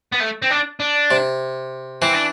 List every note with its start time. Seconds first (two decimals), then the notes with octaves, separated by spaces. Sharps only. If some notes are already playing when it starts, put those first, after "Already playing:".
0.12 B3
0.20 A3
0.42 C4
0.50 D4
0.80 D4
1.11 C3
2.02 E3 C4
2.13 D4